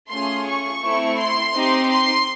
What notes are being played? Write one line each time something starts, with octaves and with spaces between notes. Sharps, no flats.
A3 C#4 F4 G#4 C6
C#6
A3 C4 E4
C6
C4 D#4 G4
C6